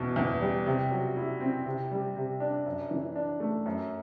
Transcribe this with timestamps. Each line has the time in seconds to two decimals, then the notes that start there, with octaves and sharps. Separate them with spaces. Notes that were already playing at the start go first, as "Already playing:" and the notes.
Already playing: E2 B2
0.16 E2
0.41 G3
0.66 C3
0.91 F#3
1.17 E4
1.40 C4
1.66 C3
1.91 G3
2.16 C3
2.40 D4
2.66 F#2
2.91 E3
3.16 D4
3.40 A3
3.66 F#2